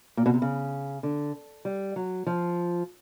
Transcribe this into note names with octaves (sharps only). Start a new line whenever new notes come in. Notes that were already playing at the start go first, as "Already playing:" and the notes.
A#2
B2
C3
C#3
D3
G3
F#3
F3